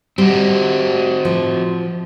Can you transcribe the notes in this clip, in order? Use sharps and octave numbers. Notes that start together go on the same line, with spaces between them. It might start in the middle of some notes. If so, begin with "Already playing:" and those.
G3 C4 F#4
F3